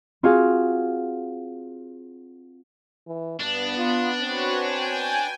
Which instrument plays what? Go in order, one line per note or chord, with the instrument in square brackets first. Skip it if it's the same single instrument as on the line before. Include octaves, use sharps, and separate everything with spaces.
[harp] C4 F4 F#4 G#4 F5
[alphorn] E3
[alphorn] G2 [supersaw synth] B3 [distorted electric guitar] D4
[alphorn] F4
[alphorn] C4 [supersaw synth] F#4 B4 C#5
[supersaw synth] G5 G#5